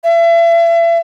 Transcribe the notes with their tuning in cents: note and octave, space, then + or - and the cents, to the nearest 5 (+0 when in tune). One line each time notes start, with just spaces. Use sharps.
E5 +35